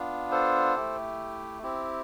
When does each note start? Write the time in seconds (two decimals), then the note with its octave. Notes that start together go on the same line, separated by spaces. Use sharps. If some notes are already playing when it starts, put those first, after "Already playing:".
Already playing: B3 D4 F4
0.31 A4 C5
0.76 A3 E4 G4
1.63 C4 E4 G4